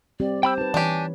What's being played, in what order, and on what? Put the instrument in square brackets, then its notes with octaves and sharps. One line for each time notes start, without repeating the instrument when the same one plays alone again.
[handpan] G3 C4 G4 [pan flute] D5
[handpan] C4 [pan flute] C5 [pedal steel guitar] G5 B5 E6
[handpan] D#4 B4 [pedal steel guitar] A5
[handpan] E3 C#5 [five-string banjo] D4 G4 [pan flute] G#5